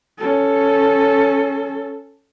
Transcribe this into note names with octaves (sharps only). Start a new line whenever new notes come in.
C#4 A4